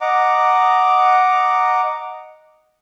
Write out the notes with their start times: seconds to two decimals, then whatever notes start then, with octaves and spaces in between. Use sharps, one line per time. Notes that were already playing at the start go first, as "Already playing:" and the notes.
0.01 D#5 F#5 A#5 D6